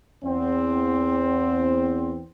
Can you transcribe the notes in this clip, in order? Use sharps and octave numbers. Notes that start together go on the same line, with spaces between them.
E2 C4